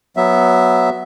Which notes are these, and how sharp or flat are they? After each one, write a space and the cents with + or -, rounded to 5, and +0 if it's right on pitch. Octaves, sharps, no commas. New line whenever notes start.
F#3 +0 B3 -5 E5 +0